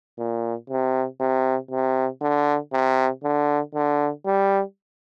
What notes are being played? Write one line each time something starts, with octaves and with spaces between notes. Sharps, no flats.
A#2
C3
C3
C3
D3
C3
D3
D3
G3